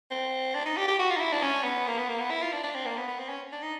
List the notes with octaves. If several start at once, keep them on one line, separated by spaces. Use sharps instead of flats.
C4
D4
D#4
G4
G4
F#4
F4
D#4
E4
D4
C#4
B3
A#3
B3
A#3
B3
E4
F4
D4
D4
C4
A#3
B3
B3
C4
C#4
D4
D#4